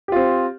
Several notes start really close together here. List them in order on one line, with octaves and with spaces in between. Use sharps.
G4 F4 C4